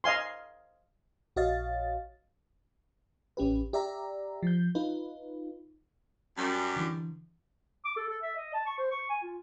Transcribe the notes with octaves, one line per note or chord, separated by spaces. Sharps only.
D#5 F5 G#5 C6
A#1 F#4 C#5 D#5 F5 A6
A1 C#4 G4 B4
G4 D5 E5 A#5
F3 G6
D#4 F4 B4
F#2 G3
D3 E3
D6
A4
A4
E5
D#5
A5
C#6
C5
C#6
G#5
F4